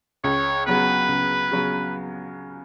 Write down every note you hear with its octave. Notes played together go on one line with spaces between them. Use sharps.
C#2 C#5
C#3 F#3 B3 B4
C#2
C#3 F#3 B3